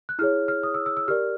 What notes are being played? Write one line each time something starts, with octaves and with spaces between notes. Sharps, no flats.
F#6
E4 G#4 C#5 F6
F6
D#6
E6
E6
E6
G4 A#4 D5 F6